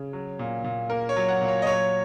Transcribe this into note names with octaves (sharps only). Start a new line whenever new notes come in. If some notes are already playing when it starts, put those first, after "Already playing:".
Already playing: C#3
F#3
A#2
A#2
A#3 A#4
C#5
F#3
F#5
A#2
C#5
D#5
F#3 C#5